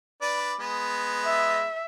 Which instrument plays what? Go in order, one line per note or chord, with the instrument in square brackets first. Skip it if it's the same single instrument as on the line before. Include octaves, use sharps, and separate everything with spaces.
[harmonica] D4 B4 D5
G#3 B3
[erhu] E5